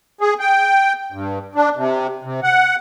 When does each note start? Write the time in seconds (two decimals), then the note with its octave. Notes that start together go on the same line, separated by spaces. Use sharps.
0.21 G#4
0.40 G5
1.12 G2
1.55 D4
1.77 C3
2.24 C3
2.43 F#5